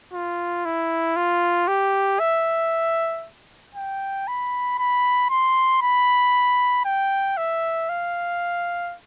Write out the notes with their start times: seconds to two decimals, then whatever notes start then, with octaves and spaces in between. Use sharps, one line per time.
0.13 F4
0.65 E4
1.16 F4
1.68 G4
2.20 E5
3.75 G5
4.28 B5
4.79 B5
5.30 C6
5.82 B5
6.85 G5
7.37 E5
7.89 F5